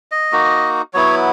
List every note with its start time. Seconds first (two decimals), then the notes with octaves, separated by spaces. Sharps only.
0.12 D#5
0.32 A#3 D#4 F#4
0.94 F#3 B3 E4 C#5